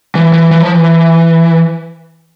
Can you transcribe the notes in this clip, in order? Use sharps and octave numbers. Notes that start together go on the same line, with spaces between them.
E3
E3
E3
F3
E3